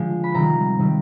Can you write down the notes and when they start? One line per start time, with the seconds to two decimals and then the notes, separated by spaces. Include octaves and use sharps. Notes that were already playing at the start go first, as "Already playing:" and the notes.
Already playing: D3 F3 G#3
0.24 B5
0.34 C3 D#3 G3 A#5
0.79 C3 D#3 G3